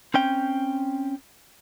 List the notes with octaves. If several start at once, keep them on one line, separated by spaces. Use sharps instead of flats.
C4 C#4 G5